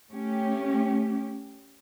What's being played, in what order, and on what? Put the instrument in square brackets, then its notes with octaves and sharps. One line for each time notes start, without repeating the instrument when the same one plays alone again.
[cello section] A3 C#4 G4